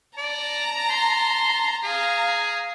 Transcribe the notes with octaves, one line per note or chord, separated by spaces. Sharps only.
D5 A5 A#5
C6
G#4 F5 A#5